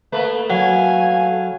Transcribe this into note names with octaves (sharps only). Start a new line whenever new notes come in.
A3 A#3 B4
F#3 F5 G#5